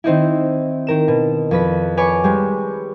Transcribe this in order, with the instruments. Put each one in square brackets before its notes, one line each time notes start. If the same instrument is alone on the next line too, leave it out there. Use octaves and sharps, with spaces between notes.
[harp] D#3 C4 D#4 E4
D#3 A#4 E7
B2
F2 B4 B6
B4 C#5 D5 G#5
G3 G#3